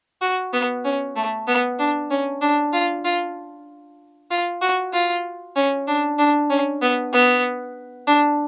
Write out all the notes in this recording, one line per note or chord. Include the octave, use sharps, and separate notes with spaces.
F#4
B3
C#4
A3
B3
D4
C#4
D4
F4
F4
F4
F#4
F4
C#4
D4
D4
C#4
B3
B3
D4